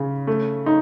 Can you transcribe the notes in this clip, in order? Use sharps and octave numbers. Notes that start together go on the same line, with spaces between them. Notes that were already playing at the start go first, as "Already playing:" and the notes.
Already playing: C#3 C#4
A3
D#4